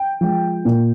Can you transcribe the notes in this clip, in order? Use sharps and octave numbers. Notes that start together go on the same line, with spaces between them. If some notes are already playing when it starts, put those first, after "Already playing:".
Already playing: G5
F3 G#3
A#2